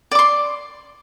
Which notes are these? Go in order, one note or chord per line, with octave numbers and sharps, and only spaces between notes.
D5 C6 D6